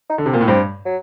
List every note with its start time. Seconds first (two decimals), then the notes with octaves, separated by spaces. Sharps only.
0.10 D#4
0.18 D3
0.26 C3
0.33 A#2
0.41 A2
0.48 G2 C4
0.85 F#3